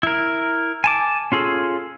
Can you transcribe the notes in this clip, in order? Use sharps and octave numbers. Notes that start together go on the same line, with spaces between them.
E4 A#4
G#5 A5 D6
C#4 F4 G#4 A4